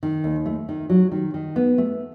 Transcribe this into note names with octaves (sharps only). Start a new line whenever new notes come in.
D#3
D#2
A3
D#3
F#3
D#3
D#3
B3
A3